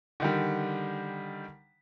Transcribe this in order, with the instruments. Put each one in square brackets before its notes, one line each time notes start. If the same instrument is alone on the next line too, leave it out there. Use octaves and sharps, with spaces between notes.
[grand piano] D3 D#3 G3